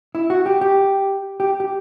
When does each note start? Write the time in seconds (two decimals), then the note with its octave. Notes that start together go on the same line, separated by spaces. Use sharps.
0.15 E4
0.30 F#4
0.46 G4
0.61 G4
1.40 G4
1.60 G4